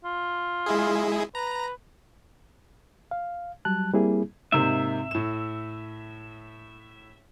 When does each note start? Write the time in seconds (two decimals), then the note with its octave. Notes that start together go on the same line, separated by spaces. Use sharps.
0.05 F4
0.66 G#3 E4 G#4
1.35 B4 A#5
3.11 F5
3.65 F#3 G3 A5 F#6
3.93 G3 A#3 C4 E4 G#4
4.52 G#2 C3 A#3 E5
5.11 A2 E7